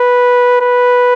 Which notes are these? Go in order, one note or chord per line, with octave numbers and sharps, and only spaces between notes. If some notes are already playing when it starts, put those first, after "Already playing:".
Already playing: B4
B4